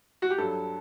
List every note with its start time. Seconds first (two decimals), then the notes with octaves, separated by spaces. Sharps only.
0.22 F#4
0.30 G4
0.38 G2 F#3 A4